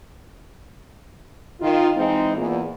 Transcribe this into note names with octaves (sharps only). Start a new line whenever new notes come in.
D#3 F4
E3 G#3 C4 D#4
E2 A#2